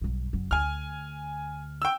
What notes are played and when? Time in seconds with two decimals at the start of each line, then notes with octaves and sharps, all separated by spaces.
0.01 B1 G2
0.33 F#1 F#3
0.51 D2 G#5 F6
1.82 G5 E6